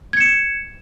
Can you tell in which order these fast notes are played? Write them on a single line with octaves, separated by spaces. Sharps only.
G#6 C#7 E7